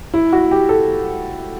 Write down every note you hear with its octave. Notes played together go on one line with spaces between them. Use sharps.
E4
F#4
G4
A4